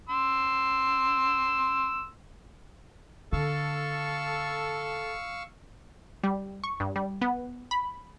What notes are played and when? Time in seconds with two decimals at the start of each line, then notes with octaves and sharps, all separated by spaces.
0.09 C6 E6
3.32 D3 A4 F5 C#6 E6
6.24 G3
6.64 C#6
6.80 G2
6.96 G3
7.22 B3
7.71 B5